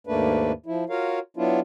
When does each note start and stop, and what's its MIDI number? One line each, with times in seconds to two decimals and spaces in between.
0.07 0.52 39
0.07 0.52 44
0.07 0.52 57
0.07 0.52 58
0.07 0.52 62
0.07 0.52 71
0.66 0.84 53
0.66 0.84 64
0.89 1.19 65
0.89 1.19 66
0.89 1.19 70
0.89 1.19 73
0.89 1.19 77
1.37 1.60 54
1.37 1.60 59
1.37 1.60 62
1.37 1.60 64
1.37 1.60 65